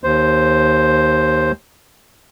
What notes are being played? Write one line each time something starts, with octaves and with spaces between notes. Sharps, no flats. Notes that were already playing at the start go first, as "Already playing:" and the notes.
D#2 C5